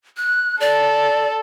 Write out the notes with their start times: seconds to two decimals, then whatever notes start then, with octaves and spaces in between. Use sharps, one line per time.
0.17 F#6
0.60 A4 D5